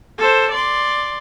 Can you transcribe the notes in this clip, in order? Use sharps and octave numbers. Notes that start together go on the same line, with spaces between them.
A4 C5
D5 C6